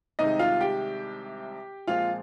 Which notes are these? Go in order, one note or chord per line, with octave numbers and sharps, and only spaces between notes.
C2 C3 D#3 G#3 D#4 D#5
F4 F5
G4 G5
A#2 F3 G#3 C4 F4 F5